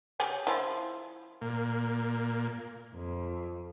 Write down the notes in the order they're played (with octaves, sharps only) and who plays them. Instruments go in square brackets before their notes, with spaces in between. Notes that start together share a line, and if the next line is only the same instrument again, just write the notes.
[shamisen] C#3 G4 G#5
F3 E4
[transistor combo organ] A#2
[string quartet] F2